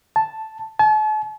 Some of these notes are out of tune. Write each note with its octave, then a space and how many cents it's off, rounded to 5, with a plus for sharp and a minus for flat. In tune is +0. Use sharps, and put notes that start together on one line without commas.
A5 -5
A5 -45